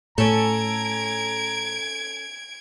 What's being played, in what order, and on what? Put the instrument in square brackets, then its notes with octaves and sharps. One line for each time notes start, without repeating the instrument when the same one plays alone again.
[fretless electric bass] A2 [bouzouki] C#4 A4 [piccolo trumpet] A#5 [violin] G#6 D7